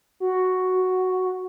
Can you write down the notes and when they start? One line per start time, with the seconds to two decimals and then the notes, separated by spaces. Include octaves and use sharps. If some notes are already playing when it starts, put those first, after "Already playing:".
0.20 F#4